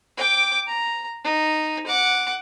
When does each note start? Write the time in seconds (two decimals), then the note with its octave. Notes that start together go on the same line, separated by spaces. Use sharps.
0.17 G5 D6
0.67 A#5
1.24 D#4
1.86 F#5 D6